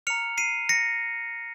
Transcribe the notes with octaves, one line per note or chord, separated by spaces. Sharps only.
A#5 F6 C#7 F7
C7 D#7
A#6 C#7